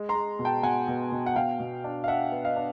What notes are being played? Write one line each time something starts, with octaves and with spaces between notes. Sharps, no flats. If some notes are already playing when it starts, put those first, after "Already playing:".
Already playing: G#3
A#5 C6
G#3
B2
G5 A5
B2 F#5 G#5
B2
B2
F#5
B2 F5 G5
B2
D4
F5
D4 E5 F#5
B3
D#5 F5
D4